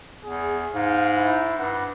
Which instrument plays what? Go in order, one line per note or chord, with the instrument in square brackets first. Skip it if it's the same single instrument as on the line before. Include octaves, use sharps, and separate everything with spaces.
[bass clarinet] E2 [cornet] G#4
[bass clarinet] G#2 [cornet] F5
[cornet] E4
[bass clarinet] G2 [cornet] F#5